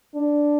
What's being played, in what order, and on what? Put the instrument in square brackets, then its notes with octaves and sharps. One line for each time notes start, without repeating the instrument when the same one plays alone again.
[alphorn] D4